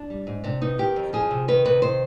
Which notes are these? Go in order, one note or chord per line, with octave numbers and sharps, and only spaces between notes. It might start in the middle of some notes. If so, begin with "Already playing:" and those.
Already playing: D4
G3
G#2
C3 D4
B3 D#4
D#3 G4
F2
F3 G#4
C3
D#3 B4
C3 B4
D#3 C5